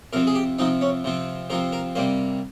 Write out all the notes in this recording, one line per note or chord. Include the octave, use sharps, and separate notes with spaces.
C3 F3 C4 A#4
G#4
G4
C3 F3 C4 D#4
C#4
C3 F3 C4
C3 F3 C4 A#4
A#4
C3 G3 A#3 C5